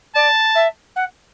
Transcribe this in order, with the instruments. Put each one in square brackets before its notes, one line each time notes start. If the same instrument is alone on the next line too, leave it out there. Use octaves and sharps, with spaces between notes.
[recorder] D5 [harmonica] A5
[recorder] E5
F#5